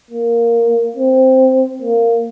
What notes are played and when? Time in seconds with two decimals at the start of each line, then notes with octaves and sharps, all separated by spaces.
0.11 A#3
0.97 C4
1.82 A#3